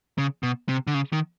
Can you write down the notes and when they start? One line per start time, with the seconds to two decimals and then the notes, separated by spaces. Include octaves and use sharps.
0.18 C#3
0.43 B2
0.69 C3
0.87 D3
0.94 C#3
1.13 D#3